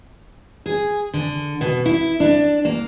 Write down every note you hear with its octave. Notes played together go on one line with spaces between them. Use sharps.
G#4
D3
B2
E4
D4
A#3